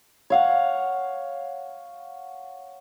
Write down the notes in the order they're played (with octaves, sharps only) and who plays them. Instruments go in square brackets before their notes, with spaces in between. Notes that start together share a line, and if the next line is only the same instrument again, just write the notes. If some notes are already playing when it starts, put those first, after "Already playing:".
[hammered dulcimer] C#5 F5 F#5